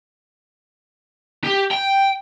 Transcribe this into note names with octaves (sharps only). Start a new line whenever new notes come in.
G4
G5